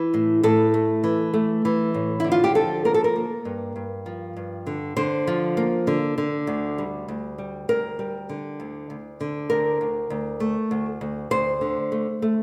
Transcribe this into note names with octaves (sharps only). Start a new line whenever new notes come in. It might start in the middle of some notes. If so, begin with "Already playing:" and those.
Already playing: E3
A2
A2 A4
A3
E3
A3
E3
A2
D3 E4
F4
G4
F3 A4
A#3 A#4
A4
A#4
A#3
G2
G2
F3
G2
D3
D3 C5
F3
A#3
D3
D3
D2
G3
D2
G3
D2 A#4
G3
D3
D2
D2
D3
D2 A#4
D2
D2
A3
D2
D2
D2 C5
D3
A3
A3